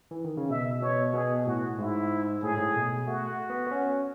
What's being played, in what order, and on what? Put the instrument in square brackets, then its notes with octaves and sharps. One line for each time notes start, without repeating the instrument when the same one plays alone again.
[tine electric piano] E3
D#3
C#3
[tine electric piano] B2 [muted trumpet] E5
[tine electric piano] B2 [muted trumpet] C#5
[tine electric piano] B2 [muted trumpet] G#4
[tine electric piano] A2 [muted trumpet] F#4
[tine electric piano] G#2 [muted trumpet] E4
[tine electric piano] A2 [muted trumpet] G#4
[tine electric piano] G#2
A2
B2
[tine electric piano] A3 [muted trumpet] F#4
[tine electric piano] B3
B3
C#4